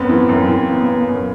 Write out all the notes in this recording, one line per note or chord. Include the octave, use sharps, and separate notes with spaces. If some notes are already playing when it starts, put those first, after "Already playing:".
Already playing: F#2 B3 C4
E3
F#2
E3
B3
B3
F#2